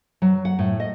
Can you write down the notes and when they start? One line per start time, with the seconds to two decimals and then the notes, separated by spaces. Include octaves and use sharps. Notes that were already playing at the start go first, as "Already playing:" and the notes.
0.22 F#3
0.45 F#5
0.59 A2
0.80 D#5